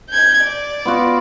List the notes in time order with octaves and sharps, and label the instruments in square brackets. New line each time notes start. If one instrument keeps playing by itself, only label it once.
[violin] G6 G#6
D5
[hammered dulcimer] B3 F4 F#4